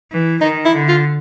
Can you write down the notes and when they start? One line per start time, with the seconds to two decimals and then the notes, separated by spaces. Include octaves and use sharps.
0.10 E3
0.41 D#3 D#4
0.65 E4
0.73 D3
0.89 F4